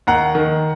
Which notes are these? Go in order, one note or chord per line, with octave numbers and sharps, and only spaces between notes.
D#2 F#5 A#5
D#3